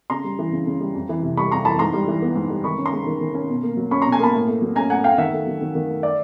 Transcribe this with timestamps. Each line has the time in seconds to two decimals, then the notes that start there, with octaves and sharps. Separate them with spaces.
0.10 C#3 A#5 C6
0.24 G3
0.39 E3
0.52 C#3
0.66 C#3
0.81 G3
0.95 F2
1.09 E3
1.23 C3
1.37 G3 B5 C#6
1.51 F2 A#5 C6
1.65 E3 A5 B5
1.79 G#2 A#5 C6
1.93 G3
2.08 E3
2.22 B3
2.35 G#2
2.50 G3
2.64 D#3 B5 C#6
2.78 C#4
2.85 A#5 C6
2.93 G#3
3.06 D#3
3.21 D#3
3.35 C#4
3.49 B2
3.63 A#3
3.77 F#3
3.91 C#4 B5 C#6
4.02 A#5 C6
4.05 B2
4.12 G#5 A#5
4.19 A#3 A5 B5
4.34 A2
4.48 A3
4.62 F#3
4.76 C#4 G#5 A#5
4.90 A2 F#5 G#5
5.04 A3 F5 G5
5.18 D#3 E5 F#5
5.33 A3
5.47 F#3
5.61 D#3
5.75 D#3
5.89 A3
6.03 D5 E5